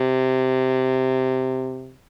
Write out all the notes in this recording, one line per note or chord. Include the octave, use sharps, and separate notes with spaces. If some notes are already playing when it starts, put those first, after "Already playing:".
Already playing: C3